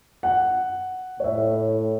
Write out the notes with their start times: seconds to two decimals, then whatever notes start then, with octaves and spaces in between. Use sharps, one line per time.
0.23 F#5
1.20 A2 C#5 E5